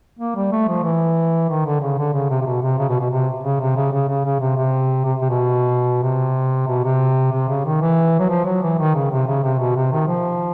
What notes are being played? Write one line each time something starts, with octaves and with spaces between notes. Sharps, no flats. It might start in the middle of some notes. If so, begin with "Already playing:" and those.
A#3
G3
A3
F3
E3
D#3
D3
C#3
D3
C#3
C3
C3
B2
C3
C#3
B2
B2
C3
C#3
C3
C#3
C#3
C#3
C#3
C3
C3
C3
C3
B2
C3
B2
C3
C3
C#3
D#3
E3
F#3
F3
F#3
E3
D#3
C#3
C3
C#3
C3
B2
C3
D#3
F3